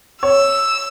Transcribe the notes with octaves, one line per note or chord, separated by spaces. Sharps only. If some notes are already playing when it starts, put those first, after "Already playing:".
C#5 E6